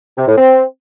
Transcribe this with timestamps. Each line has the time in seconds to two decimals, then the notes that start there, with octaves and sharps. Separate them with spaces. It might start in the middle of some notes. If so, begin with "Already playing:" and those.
0.18 C3
0.28 A2
0.38 C4